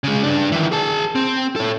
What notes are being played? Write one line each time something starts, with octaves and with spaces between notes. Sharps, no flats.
C#3 G#3
G2 D4
D#3 E3
G#4 A5
C4
A4 C#5